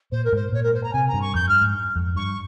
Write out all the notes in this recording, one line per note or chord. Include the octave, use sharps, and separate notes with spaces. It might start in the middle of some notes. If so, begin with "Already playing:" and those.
A#2 C5
A#4
G#2 C5
A#2 C#5
A#4
C5
A#5
C3 G#5
A#5
G2
C#6
F2 G6
G2 F6
G#2
F2
G2 C#6